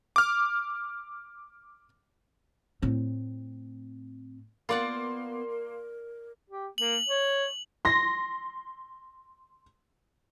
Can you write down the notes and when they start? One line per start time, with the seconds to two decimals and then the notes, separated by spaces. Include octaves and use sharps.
0.16 D6 F6
2.82 A2 C4
4.69 A#3 B3 F4 D5 F#5 C6
5.50 A#4
6.50 G4
6.78 A#3 F#7
7.09 C#5
7.85 C6 A#6